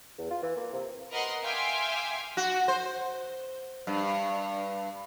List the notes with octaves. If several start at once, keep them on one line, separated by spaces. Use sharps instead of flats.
E2
F4
E3
A#3
C3
A#4 B4 D#5 F#5 A#5 C6
E5 F5 G5 G#5 C6 D6
F#4
C5
G2